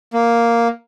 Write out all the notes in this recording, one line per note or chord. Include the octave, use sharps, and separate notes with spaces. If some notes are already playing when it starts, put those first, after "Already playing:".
A#3